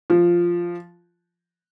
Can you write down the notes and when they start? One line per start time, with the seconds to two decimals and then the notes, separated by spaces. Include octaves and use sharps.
0.10 F3